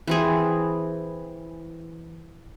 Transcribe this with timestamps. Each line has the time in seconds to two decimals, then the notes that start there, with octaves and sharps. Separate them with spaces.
0.08 E3 C4 G#4